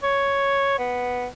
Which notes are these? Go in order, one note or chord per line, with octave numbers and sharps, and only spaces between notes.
C#5
B3